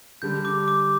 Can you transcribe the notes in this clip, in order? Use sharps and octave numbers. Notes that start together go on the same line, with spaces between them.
D3 G3 D4 G6
D6
D6